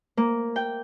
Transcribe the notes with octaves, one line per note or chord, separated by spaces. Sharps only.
A#3
G5